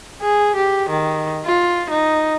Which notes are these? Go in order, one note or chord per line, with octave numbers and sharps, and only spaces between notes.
G#4
G4
D#3
F4
D#4